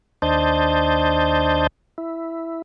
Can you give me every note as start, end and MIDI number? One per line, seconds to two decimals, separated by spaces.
0.22 1.67 39
0.22 1.67 62
0.22 1.67 72
0.22 1.67 75
0.22 1.67 81
0.22 1.67 91
1.98 2.62 64